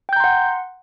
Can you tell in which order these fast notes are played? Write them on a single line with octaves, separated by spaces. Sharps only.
G5 G6 A#5 C6 F#5